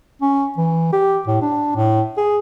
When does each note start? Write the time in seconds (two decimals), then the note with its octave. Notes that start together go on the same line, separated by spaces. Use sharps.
0.21 C#4
0.57 E3
0.93 G4
1.27 A2
1.42 D4
1.76 A2
2.17 G#4